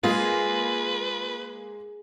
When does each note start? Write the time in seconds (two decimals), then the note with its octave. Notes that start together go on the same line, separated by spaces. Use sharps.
0.03 G#3 A#3 F4 G#4 B4